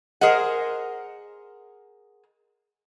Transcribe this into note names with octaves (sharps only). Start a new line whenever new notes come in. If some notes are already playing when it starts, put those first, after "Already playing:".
G#4 A#4 C5 D#5 F#5